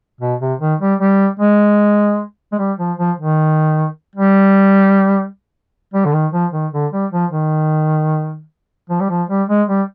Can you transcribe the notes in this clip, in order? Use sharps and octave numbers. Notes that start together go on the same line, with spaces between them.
B2
C3
D#3
G3
G3
G#3
G#3
G3
F3
F3
D#3
G3
G3
D3
D#3
F3
D#3
D3
G3
F3
D#3
F3
G3
F3
G3
G#3
G3